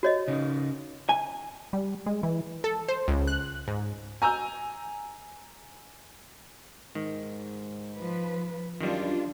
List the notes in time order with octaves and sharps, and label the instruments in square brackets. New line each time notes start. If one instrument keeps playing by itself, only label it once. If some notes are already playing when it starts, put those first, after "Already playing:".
[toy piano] F#4 C#5 D#5
[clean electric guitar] C#3 D#4
[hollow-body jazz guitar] G#5
[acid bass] G3
G#3
E3
[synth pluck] A4
C5
C#2
F#6
G#2
[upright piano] G#5 A#5 E6 G6
[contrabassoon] G#2 [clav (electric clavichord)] D#3
[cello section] F3 B4
[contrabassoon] F#2 [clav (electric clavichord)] D#3 G3 [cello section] D4 F4